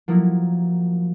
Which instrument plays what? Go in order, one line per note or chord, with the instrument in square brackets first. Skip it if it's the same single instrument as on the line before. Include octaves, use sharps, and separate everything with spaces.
[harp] F3 F#3 A#3 E4